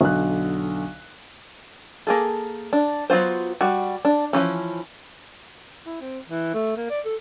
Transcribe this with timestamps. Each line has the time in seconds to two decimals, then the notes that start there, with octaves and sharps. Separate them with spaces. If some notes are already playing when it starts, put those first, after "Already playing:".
0.01 B1 D3 F#6
2.07 A#3 G#4 A4
2.73 D4
3.10 F#3 B3 F4 C5
3.61 G3 F#4
4.05 D4
4.33 E3 F3 C#4
5.86 E4
6.01 C4
6.28 E3
6.54 A3
6.77 A#3
6.90 D5
7.05 A4